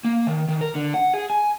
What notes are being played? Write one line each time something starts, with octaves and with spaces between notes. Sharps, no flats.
A#3
D#3
D#3
A#4
D3
F#5
G#4
G#5